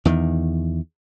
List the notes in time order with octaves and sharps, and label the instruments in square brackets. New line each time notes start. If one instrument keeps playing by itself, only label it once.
[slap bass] E2 D#3